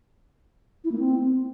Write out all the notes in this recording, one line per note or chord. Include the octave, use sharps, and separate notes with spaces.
E4
A#3
C4